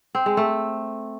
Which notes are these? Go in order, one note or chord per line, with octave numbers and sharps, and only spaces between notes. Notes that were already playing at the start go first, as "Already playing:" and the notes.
C4
G#3
A3